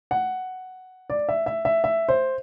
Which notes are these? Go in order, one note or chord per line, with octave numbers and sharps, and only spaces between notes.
F#5
D5
E5
E5
E5
E5
C5